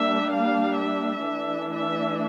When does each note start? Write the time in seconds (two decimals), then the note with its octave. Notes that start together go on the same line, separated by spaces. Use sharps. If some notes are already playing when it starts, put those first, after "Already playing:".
Already playing: G3 A#3 D4 E5
0.30 F5
0.77 E5
1.25 E3 A3 D4
1.73 E5